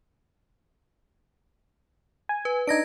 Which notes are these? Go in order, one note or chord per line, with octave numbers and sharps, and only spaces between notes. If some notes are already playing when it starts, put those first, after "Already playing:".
G#5
B4
D4 D#4 G#6 A#6 D7